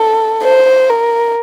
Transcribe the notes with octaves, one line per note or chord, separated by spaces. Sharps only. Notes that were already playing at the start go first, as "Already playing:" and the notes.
Already playing: A4
C5
A#4